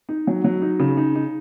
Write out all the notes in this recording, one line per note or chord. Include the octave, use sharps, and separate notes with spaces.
D#4
F#3
F#3
D#4
C#3
D#4
D#4